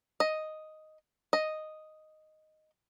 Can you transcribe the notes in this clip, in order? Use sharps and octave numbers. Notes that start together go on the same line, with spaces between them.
D#5
D#5